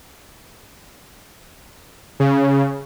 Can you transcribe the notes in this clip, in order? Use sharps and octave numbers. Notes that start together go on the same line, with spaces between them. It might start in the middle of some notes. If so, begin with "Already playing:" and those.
C#3